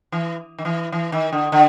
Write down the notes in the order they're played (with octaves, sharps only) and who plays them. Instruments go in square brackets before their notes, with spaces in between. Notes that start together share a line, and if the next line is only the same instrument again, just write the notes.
[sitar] E3
D#3
E3
E3
D#3
D3
D3